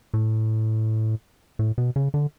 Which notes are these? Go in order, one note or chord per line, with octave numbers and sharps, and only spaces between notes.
A2
A2
B2
C#3
D3